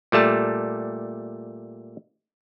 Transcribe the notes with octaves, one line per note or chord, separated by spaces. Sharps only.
A#2 G3 A3 A5